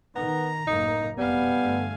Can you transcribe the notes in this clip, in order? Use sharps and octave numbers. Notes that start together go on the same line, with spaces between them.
D#3 B3 A#5
F#1 A2 A#3 D#4
F1 B2 G3 B3 F5 G#5
G2 D3 A3